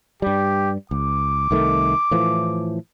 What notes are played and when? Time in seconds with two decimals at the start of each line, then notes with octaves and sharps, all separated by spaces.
0.22 G2 G3 G4
0.91 C#2 D6
1.51 C2 D#3 A3
2.11 A2 E3 F3